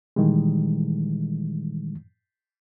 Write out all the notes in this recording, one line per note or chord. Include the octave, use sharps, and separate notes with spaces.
A#2 D#3 E3 G3 G#3